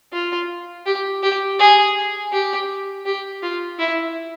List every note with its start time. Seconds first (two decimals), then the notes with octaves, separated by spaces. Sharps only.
0.13 F4
0.86 G4
1.23 G4
1.59 G#4
2.32 G4
3.06 G4
3.43 F4
3.79 E4